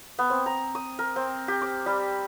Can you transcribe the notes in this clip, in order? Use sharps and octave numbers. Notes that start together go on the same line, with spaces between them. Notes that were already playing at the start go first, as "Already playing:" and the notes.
B3
C4
A#5
D#6
A#4
C4
G4
D6
G3